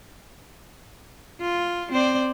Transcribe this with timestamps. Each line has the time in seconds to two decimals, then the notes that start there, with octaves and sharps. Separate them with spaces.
1.41 F4
1.92 C4 C5 D5